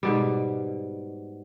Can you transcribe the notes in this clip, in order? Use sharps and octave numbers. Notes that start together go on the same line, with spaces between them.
G#2 B2 G3